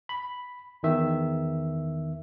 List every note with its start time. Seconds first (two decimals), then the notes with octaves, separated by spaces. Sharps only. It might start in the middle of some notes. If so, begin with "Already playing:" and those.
0.09 B5
0.83 E2 D#3 E5